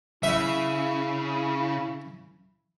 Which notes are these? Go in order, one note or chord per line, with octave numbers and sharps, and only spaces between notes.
C#3 E4 E5